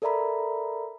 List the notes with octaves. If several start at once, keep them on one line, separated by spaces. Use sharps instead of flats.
A4 A#4 D5 E5 A#5 B5